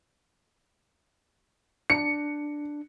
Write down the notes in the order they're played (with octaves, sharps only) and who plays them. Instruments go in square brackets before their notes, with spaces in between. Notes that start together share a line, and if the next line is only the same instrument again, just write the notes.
[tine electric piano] D4 [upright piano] C#7